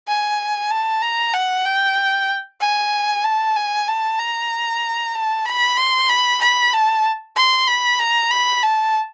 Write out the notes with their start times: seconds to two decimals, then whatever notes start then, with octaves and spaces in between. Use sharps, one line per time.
0.08 G#5
0.71 A5
1.02 A#5
1.34 F#5
1.65 G5
2.60 G#5
3.24 A5
3.56 G#5
3.88 A5
4.19 A#5
5.15 A5
5.46 B5
5.77 C6
6.09 B5
6.41 B5
6.73 A5
7.36 C6
7.68 B5
7.99 A#5
8.31 B5
8.63 A5